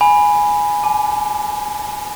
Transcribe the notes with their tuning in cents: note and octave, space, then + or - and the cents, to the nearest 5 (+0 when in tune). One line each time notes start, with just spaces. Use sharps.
G#5 +0 B5 +0
G#5 +45 D6 +0